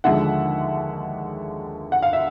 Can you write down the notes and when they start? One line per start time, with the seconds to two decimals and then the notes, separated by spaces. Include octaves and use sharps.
0.04 D#2 D3 F3 G#3 E5 F#5
1.92 F#5
2.02 F5
2.13 E5